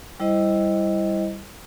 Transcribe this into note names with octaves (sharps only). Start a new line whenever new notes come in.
G3 E4 C5 D#5